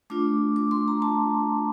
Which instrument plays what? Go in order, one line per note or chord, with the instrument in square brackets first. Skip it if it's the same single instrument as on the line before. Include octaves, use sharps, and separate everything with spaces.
[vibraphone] A3 D4 F4 D6
D6
C6
A#5
A5